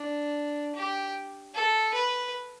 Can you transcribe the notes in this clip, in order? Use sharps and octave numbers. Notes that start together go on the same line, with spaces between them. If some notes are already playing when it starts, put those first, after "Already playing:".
Already playing: D4
G4
A4
B4